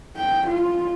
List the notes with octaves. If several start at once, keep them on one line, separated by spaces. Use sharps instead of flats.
G5
F4